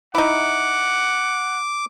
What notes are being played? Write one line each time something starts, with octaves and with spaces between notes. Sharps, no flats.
D#4 E4 F#5 D6